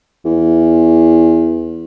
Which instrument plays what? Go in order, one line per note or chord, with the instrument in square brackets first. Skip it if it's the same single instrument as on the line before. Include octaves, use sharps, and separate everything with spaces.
[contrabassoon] E2